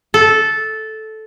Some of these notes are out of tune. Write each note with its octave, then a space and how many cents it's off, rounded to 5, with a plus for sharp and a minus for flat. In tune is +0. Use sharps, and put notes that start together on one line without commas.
A4 -10